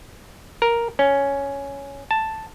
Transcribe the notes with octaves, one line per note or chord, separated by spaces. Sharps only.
A#4
C#4
A5